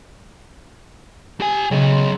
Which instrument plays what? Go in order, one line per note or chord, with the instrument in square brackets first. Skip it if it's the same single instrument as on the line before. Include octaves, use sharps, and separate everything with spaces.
[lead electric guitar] G4 G#5
[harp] C#3 A3 A#5 [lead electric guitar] F#3 D#5
[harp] C6